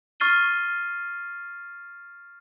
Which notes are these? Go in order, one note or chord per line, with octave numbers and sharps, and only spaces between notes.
C#6 F6 A6 C7 D#7 G7